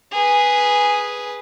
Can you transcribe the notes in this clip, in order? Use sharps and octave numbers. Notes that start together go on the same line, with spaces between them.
G#4 B4